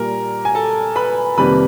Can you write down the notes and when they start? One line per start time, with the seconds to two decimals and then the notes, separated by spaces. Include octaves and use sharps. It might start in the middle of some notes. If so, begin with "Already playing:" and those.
Already playing: A#2 G3 A#3 A#4
0.45 G#5
0.55 A4 A5
0.96 B4 B5
1.37 F2 C3 D#3 G3 A#3 B4 B5